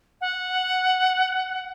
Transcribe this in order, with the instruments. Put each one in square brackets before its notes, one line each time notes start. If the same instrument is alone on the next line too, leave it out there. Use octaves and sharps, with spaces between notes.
[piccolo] F#5